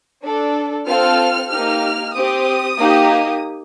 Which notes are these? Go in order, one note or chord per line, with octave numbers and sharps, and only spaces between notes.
D4 A4
C4 F4 A4 F6
A#3 D#4 G4 F6
C4 G4 D#6
A#3 D#4 G4